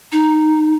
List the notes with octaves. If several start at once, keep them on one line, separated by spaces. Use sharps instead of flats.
D#4